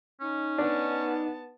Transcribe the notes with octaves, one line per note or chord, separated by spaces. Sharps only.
C#4 D#4
B3 D4 A5